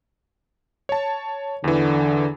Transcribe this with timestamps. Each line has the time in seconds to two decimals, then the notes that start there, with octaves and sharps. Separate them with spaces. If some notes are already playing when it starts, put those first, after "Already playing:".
0.89 C#5 A5
1.64 E2 D3 E3